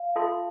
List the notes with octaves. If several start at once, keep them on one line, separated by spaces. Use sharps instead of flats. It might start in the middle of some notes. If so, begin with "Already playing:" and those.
Already playing: F5
F4 A4 E5 A5 C6